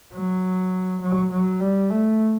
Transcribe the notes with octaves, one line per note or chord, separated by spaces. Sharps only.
F#3
F#3
F#3
G3
A3